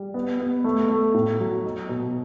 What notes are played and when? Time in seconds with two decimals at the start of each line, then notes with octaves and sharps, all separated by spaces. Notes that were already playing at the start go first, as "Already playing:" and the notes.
Already playing: G3
0.14 B3
0.40 B3
0.64 A3
0.89 A3
1.14 A2
1.40 F#3
1.64 D#4
1.89 B2